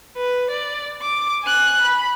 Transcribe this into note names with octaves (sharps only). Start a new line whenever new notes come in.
B4
D5
D6
G#5 F#6
B5